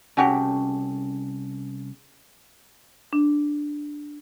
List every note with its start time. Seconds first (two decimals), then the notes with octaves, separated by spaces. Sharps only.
0.17 C2 C#3 C#4 F#4 G4 A5
3.13 D4